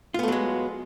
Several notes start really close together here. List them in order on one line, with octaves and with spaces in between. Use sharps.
F4 B3 A3 F#3 G#3